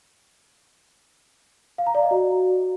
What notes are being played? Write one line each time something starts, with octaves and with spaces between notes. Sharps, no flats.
F5
A#5
D5
D#5
F#4